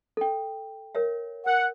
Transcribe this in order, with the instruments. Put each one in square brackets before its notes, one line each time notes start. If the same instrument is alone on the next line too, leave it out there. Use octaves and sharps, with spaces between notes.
[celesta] A4 G5
[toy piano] A#4 C#5 E5
[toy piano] A#4 [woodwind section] F#5